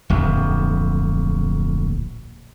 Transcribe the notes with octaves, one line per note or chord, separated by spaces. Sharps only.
D1 A#1 F2